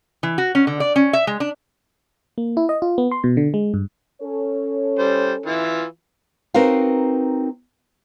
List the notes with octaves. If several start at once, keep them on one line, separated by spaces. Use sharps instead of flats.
E3
F#4
C#4
D3
D5
C#4
E5
G#3
D4
A#3
E4
D#5
F4
B3
C6
B2
D3
G#3
G2
C#4 A4 C#5
G3 C5
E3 E4 F4
C4 D#4 F#4 A#4 B4 F5